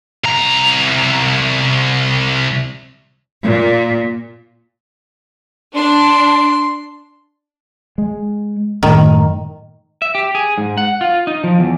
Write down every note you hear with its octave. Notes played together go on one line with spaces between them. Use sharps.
C2 A#5
A#2
D4 C6
G#3
F#2 A2 D#3
E5
G4
G#4
G#2
F#5
F4
D#4
F3
E2